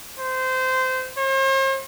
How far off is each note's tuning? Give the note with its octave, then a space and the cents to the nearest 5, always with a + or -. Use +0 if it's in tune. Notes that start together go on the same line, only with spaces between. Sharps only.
C5 -20
C5 +45